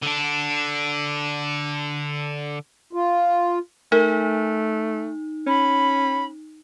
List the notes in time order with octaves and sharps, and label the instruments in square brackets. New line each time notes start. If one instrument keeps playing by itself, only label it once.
[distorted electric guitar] D3 D4
[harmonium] F4
[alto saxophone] A3 [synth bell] D#4 [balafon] A#4
[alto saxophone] C#4 [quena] B5